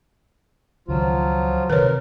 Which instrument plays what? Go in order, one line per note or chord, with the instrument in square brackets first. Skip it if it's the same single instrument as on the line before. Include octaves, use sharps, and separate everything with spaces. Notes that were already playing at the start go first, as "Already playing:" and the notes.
[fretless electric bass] C#2 D#3 [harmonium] F3 F#3 F4
[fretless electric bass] C3 D#3 [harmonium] A#4 [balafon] B4 C#5